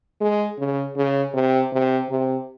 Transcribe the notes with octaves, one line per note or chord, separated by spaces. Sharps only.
G#3
C#3
C#3
C3
C3
C3